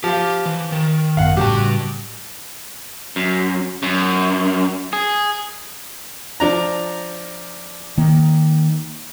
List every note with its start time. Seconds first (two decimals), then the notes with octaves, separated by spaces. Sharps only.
0.04 F3 F4 G4
0.46 E3
0.72 D#3
1.17 G#1 F#2 B3 F5 F#5
1.37 A2 C#3 G3 F#4 G4 A5
3.16 F#2
3.83 F#2
4.93 G#4
6.40 F3 D4 A#5
7.98 D#3 A#3